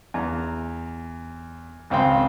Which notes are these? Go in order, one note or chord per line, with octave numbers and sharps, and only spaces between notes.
E2 A#5
G#1 C#2 C4 G5 C6